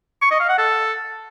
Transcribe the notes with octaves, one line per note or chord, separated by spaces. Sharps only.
C#6
D#5
F5
F#5
A4